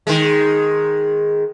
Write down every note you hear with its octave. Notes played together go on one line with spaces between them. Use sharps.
D#3 G#3